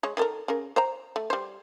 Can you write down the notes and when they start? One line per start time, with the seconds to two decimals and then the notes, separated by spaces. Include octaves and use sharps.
0.03 G#3 C#5
0.17 D#3 A4 A#4
0.48 C#3 A#4
0.76 C5 G5 A#5
1.16 A3
1.30 G3 C5